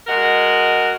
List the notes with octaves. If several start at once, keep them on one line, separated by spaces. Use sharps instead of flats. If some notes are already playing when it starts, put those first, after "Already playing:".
G#3 F#4 A#4 D#5 F#5